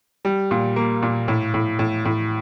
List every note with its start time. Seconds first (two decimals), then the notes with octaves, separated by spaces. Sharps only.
0.25 G3
0.51 A#2
0.76 A#3
1.02 A#2
1.28 A2
1.54 A2
1.79 A2
2.05 A2